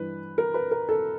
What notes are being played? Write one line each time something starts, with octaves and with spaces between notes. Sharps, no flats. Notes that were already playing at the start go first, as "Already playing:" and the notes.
Already playing: G2 E3 B4
A#4
B4
A#4
A4